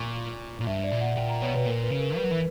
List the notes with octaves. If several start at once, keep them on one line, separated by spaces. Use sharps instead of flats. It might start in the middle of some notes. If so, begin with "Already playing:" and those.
Already playing: A#2 C#6 D6
A#2
G2 E5
D5
A#2
F#5
A#2 G5
A#5
B2 C#5
B2 B4
A#2 A#4
B4
C#3
A#4
G3 B4
F#3
E3